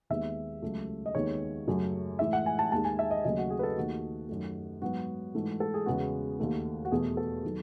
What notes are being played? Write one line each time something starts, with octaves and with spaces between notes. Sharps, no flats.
D#2 D#3 G#3 B3 E5
C#2 C#3 F#3 A3
D#5
D#2 D#3 G#3 B3 C#5
F#2 C#3 F#3 A3
A2 E3 G#3 E5
F#5
G#5
A5
D#2 D#3 G#3 A5
G#5
E5
D#5
D#2 C#3 F#3 A3 D#5
F#4
G#4
B4
A4
D#2 D#3 A3 F#4
F#2 D#3 A3
G#2 F#3 B3 F#4
G#2 E3 A3
A4
G#4
E2 C#3 G#3 B3 F#4
D#2 D#3 A3
F#4
E2 B2 A3 G#4
A4
D#3 F#3